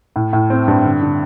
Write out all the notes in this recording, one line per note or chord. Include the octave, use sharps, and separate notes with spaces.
A2
A2
C4
G2
D3
D3